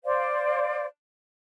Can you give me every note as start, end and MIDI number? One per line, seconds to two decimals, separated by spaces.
0.05 0.85 72
0.05 0.85 74
0.05 0.85 77